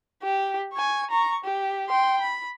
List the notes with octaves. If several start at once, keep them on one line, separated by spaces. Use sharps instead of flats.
G4
G#5 C#6
A#5 C#6
G4
G5 C6
B5